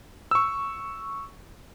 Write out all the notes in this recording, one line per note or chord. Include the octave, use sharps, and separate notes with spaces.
C#6 E6